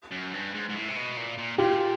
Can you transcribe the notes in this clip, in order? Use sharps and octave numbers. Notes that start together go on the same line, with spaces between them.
F#2
G2
G#2
G#2
A2
C3
B2
A#2
A#2
A#2 F4 G4